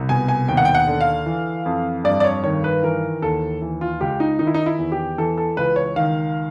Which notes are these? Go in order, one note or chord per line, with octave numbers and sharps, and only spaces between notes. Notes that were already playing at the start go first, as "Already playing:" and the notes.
Already playing: C2
B2 G#5
G#5
D#2 G5
F#5
G5
F#5
D3
F5
E3
F2
G2 D5
D5
C#5
D#3 C#5
B4
E3 A#4
D#2 A4
E3
F4
C#2 G4
D#4
D#3 D#4
E4
D#4
E4
E2
G4
E3 A4
A4
C#2 B4
C#5
D#3 F5